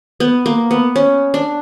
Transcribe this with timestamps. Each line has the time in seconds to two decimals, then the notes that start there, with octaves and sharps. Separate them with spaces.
0.20 B3
0.46 A#3
0.71 B3
0.96 C#4
1.34 D4